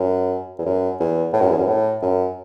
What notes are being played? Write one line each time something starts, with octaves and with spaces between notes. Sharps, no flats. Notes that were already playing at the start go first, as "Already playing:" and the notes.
Already playing: F#2
E2
F#2
E2
A2
F#2
E2
F#2
A2
F#2